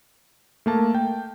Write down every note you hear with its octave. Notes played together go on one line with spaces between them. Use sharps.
A3 A#3 A5
G5